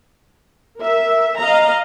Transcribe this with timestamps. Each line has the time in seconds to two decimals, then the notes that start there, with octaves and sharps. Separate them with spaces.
0.79 A#4 E5
1.39 D#5 F5 A#5